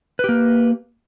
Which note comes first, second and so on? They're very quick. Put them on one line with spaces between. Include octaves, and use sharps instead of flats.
B4 G4 A#3